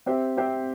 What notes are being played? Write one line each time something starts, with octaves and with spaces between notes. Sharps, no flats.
C4 G4 C5 E5
C4 G4 C5 E5